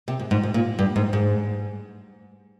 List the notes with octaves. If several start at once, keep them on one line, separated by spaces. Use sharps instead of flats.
C3
G#2
G#2
G#2
A#2
G2
G#2
G#2